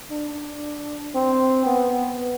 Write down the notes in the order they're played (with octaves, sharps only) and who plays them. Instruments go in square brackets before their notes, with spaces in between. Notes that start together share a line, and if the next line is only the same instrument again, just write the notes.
[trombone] D4
C4
B3